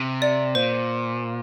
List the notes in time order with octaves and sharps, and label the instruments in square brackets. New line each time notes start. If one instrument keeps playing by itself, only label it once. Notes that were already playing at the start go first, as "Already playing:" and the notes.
Already playing: [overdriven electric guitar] C3
[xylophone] D5
[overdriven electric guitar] A#2 [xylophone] C5